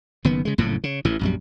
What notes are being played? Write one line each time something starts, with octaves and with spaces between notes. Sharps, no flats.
F#1 D#3 B3
C#3 G#3
F#1 F2 A2 C#3
C#3
A1 A2 E3
A#1 F#2 G3